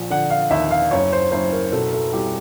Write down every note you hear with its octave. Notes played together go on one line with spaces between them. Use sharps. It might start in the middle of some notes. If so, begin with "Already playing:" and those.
Already playing: A#1 A#2
D3 F#5
F5
D#2 E5
F5
F#1 C#5
C5
F#1 C5
A#4
B2 A4
A4
C2 G4